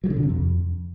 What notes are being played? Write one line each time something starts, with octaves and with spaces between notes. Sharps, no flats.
F#3
D3
B2
C3
F2